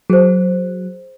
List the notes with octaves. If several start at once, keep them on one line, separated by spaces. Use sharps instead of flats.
F#3 G#4 C5